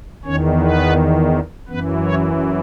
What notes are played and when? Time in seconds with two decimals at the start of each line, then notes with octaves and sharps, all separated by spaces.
0.25 E2 D#3 C#4 C#5
0.60 B3 B4
1.68 F#2 E3 B3 B4
2.04 C#4 C#5